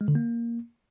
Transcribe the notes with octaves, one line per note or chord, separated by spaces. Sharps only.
G#3
D3
A#3